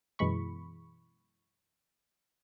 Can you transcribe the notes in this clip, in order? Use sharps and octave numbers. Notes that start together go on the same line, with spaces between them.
F#2 B2 E3 G#3 B5 C#6